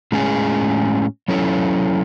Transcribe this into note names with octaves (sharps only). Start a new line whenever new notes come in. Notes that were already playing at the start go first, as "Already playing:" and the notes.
A2 G#3 C#4 G#4
F#3 C#4 E4 A4 C#5